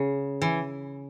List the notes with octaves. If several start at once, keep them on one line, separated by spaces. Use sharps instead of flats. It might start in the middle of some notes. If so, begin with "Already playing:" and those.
Already playing: C#3
E3